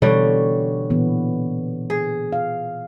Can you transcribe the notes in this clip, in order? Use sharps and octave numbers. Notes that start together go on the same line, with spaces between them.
B2 D3 E3 G3 C#5
A#2 E3 B3
G#4
F5